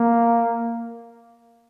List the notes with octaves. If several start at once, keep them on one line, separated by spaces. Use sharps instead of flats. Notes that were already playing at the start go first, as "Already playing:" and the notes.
Already playing: A#3